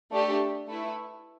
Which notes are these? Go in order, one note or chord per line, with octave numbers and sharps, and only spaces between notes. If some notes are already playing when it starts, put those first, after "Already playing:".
A3 D4 G4
A3 E4 B4